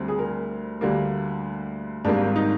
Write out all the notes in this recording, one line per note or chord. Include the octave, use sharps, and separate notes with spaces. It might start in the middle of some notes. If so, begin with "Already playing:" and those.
Already playing: D2 D3 G3 C4
G#4
A#4
D2 D3 G3 A#3
G#1 G#2 G3 A#3 D4
D#4